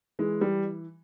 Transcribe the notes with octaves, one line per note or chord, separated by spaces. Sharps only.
E3 G#3
G3